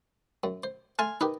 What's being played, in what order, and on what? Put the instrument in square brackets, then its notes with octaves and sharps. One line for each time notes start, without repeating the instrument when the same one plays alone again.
[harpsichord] F#2
C5
[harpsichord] A3 A5 [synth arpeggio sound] G#5 C6 F6
[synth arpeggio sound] D#4 [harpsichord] G4 A#4 B4